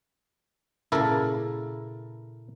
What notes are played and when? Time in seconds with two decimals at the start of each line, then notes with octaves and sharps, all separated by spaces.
0.92 A#2 C#3 E4 A4 A#4